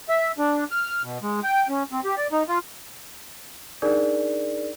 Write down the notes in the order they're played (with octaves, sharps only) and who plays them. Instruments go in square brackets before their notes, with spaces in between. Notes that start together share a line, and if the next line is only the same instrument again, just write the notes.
[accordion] E5
D4
F6
B2
G#3
G5
C#4
C4
G4
D5
D#4
F4
[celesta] D4 D#4 G#4 A#4 D5